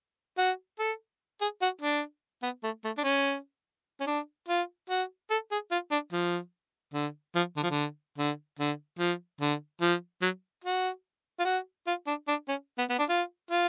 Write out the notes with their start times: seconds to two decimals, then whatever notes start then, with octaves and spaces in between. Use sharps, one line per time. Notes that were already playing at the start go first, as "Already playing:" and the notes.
0.38 F#4
0.79 A4
1.41 G#4
1.62 F#4
1.81 D4
2.43 B3
2.63 A3
2.84 A3
2.98 D4
3.04 C#4
4.00 C#4
4.07 D4
4.48 F4
4.90 F#4
5.30 A4
5.51 G#4
5.71 F4
5.91 D4
6.12 F3
6.94 D3
7.35 F3
7.56 D3
7.63 F3
7.70 D3
8.18 D3
8.59 D3
8.99 F3
9.41 D3
9.81 F3
10.22 F#3
10.64 F#4
11.39 F4
11.45 F#4
11.87 F4
12.07 D4
12.28 D4
12.48 C#4
12.78 B3
12.89 B3
12.99 D4
13.09 F4
13.51 F4